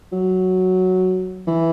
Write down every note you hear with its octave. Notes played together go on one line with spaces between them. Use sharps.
F#3
E3